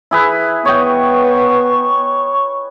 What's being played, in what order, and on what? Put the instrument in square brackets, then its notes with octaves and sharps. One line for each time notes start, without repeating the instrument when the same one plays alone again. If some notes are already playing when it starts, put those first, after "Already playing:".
[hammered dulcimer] E4 G#4 B4
[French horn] B3 [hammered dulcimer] C#5 D#5 G5 [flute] C#6